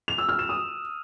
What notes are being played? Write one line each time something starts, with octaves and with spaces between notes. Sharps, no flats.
F7
E6
F6
E7
D#6